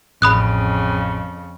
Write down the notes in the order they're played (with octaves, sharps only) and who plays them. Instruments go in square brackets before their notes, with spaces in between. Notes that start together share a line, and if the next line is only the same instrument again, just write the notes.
[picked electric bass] A1 [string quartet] F2 C#3 [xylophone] B5 D#6 F#6